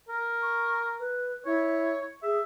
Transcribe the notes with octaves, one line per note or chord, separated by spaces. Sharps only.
A#4
C#6
B4
E4 C#5
G#4 E5